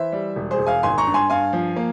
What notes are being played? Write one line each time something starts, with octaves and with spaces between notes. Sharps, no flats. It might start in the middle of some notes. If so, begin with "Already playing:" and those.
Already playing: E3 C5 E5
G3
E1
G#4 C5
E1
F5 G#5
G#1 G#5 C6
A#5 C#6
G2
G#5 C6
G2 F5 G#5
F3
A#3